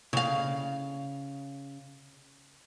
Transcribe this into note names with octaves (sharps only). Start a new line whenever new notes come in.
C#3 F5